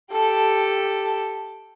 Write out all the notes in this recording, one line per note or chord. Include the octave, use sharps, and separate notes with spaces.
G4 A4